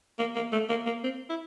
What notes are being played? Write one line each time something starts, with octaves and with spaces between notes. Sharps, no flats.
A#3
A#3
A3
A#3
A#3
C4
E4